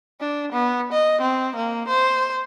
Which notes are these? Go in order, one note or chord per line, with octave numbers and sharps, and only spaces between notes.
D4
B3
D#5
C4
A#3
C5